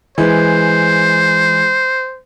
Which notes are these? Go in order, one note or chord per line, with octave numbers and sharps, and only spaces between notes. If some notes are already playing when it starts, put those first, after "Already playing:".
E3 G#3 C5